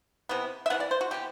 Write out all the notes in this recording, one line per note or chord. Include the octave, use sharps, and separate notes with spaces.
C3 E3 B3
E5
C3 E3 B3 F#5
D5
C5
F#4
C3 E3 B3 G4